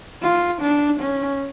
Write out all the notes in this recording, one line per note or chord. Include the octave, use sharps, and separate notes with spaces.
F4
D4
C#4